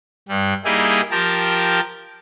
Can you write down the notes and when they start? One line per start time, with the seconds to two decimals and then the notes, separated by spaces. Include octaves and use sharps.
0.28 G2 G3
0.65 G3 A#3 D#4 E4 G4 G#4
1.11 F3 G4 A#4 A5